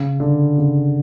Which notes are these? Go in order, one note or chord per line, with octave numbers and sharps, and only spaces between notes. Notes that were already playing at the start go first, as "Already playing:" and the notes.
Already playing: C#3
D3
C#3